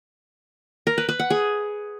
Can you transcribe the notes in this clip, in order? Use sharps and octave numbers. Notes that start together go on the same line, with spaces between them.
A#4
B4
B4
F#5
G#4